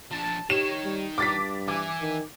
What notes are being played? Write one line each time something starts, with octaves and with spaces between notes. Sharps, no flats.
F3 D4 A5
D#3 G4 C#5 E7
G3
G2 D4 D6 A6 B6
E3 E5 G#5 D6
D#3